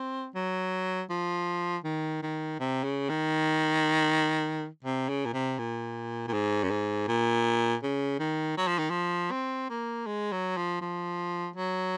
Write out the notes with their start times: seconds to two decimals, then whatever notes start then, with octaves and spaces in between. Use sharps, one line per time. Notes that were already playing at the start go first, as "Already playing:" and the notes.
Already playing: C4
0.35 F#3
1.10 F3
1.84 D#3
2.23 D#3
2.60 C3
2.84 C#3
3.10 D#3
4.84 C3
5.09 C#3
5.26 A#2
5.34 C3
5.59 A#2
6.28 A#2
6.33 G#2
6.63 F#2
6.71 G#2
7.08 A#2
7.83 C#3
8.19 D#3
8.57 F#3
8.68 F3
8.79 D#3
8.90 F3
9.31 C4
9.70 A#3
10.07 G#3
10.32 F#3
10.57 F3
10.81 F3
11.56 F#3